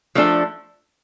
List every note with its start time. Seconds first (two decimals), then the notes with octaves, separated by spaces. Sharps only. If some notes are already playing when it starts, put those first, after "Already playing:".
0.15 F3 A3 D4 A4